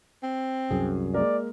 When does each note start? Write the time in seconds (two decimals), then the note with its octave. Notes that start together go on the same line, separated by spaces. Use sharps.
0.23 C4
0.71 C2 F#2 G#4
1.14 G#3 A#3 A#4 D5